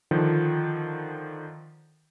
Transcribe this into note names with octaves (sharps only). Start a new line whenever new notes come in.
D3 D#3 F3